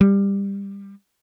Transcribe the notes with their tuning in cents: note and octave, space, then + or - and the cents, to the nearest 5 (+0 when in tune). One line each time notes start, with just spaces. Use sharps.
G3 +20